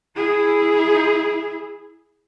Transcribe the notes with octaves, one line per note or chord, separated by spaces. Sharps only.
E4 G#4